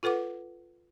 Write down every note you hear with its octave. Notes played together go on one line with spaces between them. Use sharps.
F4 A4 B4 F#5 D6